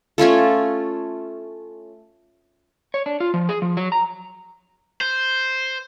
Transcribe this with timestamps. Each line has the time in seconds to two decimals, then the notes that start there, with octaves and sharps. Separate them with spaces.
0.18 A3 C#4 F4 A4
2.94 C#5
3.06 D4
3.20 F4
3.34 F3
3.49 G#4
3.62 F3
3.77 F#3
3.92 A#5
5.01 C5